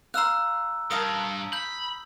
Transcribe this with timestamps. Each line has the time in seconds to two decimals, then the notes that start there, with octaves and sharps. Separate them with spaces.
0.14 F5 A#5 C6 E6 F#6
0.91 G2 A#4 F5 A5 D#6
1.53 B5 G6